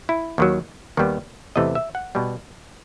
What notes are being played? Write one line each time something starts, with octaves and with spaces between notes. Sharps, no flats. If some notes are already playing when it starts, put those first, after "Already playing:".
E4
D#2 D#3 F#3
D#2 D#3 G3 B3
E2 C3 E3 A3 D#5
E5
F#5
B2 G3 B3